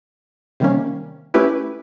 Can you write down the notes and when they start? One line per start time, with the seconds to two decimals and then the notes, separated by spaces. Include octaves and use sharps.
0.60 C3 D#3 G3 A#3 C#4
1.34 A3 C#4 E4 G4 B4